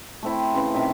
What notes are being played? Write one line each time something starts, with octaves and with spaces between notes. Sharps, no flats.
A3 C4 E4
C#3 E3 C6
C3 D#3 E5 F5